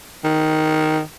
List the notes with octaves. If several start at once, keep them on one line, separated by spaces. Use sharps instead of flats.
D#3